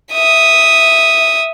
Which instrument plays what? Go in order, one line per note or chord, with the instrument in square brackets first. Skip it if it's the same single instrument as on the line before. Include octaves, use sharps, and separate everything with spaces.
[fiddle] E5 D#6